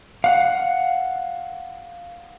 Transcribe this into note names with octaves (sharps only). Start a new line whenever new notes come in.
F5 F#5